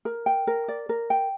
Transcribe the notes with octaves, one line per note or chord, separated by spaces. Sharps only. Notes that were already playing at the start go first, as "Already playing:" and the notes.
A#4
G5
A#4
D5
A#4
G5